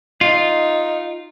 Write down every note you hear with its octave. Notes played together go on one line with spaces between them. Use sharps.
D#4 F4